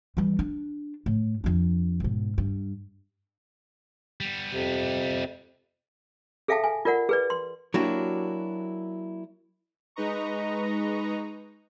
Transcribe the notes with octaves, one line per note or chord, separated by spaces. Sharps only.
E3 G3
D4
A2
F2 D4
G#2 B2
G2
G3 B3
F2 C3
G#4 A4 E5 F5 G5 A5
G#5
F4 A#4 D5 F#5
G#4 B4 D5
C6
F#3 A#3 D4 E4 F#4 G4
G#3 D#4 B4 D#5 A#5 C#6